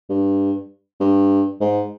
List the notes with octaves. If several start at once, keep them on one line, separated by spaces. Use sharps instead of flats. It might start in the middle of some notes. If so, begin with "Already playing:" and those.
G2
G2
G#2